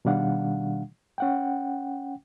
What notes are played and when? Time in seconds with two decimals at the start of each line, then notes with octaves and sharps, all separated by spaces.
0.05 B2 D#3 G3 D4 F5 F#5
1.18 C#4 F#5 G5